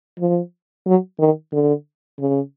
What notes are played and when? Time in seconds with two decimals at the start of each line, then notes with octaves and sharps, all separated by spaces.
0.20 F3
0.86 F#3
1.19 D#3
1.53 D3
2.19 C#3